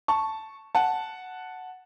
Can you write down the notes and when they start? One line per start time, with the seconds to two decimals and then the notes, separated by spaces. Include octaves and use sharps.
0.08 A5 C#6
0.75 F#5 A5